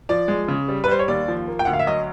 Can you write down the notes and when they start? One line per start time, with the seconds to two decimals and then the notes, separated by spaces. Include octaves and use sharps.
0.09 F3 D5
0.28 G#3
0.48 C#3
0.68 G3
0.84 B4
0.88 G3 C5
0.99 C#5
1.08 D#2 D5
1.28 F3
1.48 A#3
1.59 G5
1.65 D2 F#5
1.73 F5
1.79 E5
1.87 F#3 D#5